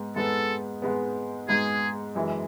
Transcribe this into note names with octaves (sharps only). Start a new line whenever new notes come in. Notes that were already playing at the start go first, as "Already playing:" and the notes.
Already playing: G#2 G#3 B3
G#2 G#3 B3 A4
G#2 G#3 B3
G#2 G#3 B3 G#4
F#2 E3 G#3